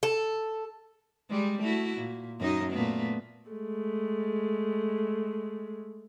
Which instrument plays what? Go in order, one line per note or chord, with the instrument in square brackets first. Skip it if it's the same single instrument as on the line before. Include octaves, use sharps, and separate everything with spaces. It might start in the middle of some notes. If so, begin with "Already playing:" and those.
[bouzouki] A4
[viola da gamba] G3 G#3
A3 E4 F#4
A#2
F#2 D#4 D#5
A#2 A3 B3
[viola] G#3 A3